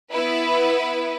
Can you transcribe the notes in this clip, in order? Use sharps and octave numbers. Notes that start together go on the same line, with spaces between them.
B3 E4 B4